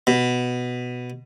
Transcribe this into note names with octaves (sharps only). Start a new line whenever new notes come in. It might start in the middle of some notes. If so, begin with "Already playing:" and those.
B2